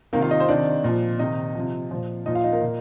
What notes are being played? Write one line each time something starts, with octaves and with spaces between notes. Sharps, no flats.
C3 D#3 A#3 A#4
F4 F5
D#4 D#5
C4 C5
C3 D#3 D4 D5
A#2 F3
C3 D#3 D#4 D#5
C3 F3
A#2 F3
A#2 F3 D#4 D#5
F4 F5
D#4 D#5
A#3 A#4
A#2